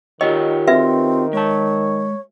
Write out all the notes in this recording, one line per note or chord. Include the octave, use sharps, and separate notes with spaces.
D#3 F4 G4 C#5 D#5
C4 F#4 B4 E5
G#3 C#5 A5